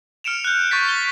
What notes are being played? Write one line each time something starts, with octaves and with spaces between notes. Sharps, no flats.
F6 C#7 D7 E7 F7
F#6 G6
C#6 G6 A6 B6
G7